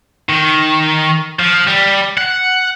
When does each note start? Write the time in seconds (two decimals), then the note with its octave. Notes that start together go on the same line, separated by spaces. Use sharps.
0.29 D#3
1.39 F3
1.67 G3
2.18 F#5